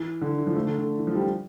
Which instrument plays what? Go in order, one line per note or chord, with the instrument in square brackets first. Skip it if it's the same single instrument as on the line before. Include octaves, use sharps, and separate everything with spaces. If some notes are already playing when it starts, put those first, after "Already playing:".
Already playing: [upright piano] E3
D3
E3
F3
A3
D3
D3
E3
F3
G3